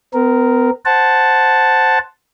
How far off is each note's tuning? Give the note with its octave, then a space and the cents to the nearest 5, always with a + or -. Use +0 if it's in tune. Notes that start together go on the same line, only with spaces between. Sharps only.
B3 +40 A#4 +0
C5 +0 F#5 +0 A5 +0